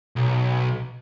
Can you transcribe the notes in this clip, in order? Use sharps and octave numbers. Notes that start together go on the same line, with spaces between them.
B1